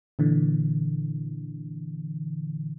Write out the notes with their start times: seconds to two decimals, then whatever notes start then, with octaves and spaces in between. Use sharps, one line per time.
0.19 A#2 D3 E3